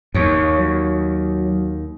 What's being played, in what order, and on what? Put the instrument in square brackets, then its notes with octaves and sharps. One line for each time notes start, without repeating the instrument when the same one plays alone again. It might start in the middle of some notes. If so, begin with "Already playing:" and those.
[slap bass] D#2 [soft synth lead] C#5
[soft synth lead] F#3